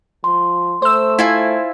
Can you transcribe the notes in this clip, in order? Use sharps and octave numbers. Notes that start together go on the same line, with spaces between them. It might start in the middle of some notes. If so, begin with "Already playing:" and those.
F3 C6
A3 C5 E6
E4 F4 G#5